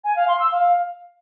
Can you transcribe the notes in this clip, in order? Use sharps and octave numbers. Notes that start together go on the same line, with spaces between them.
G#5
F5
C6
E6
F5